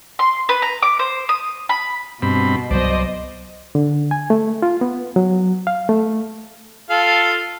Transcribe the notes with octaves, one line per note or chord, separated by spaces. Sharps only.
C6
B4
A#5
D6
C5
D#6
B5
G2 B2 C4 B5
C2 F3 F#3 C5 D5 D#5
D3
G#5
A3
F4
B3
F#3
F5
A3
F4 A4 F5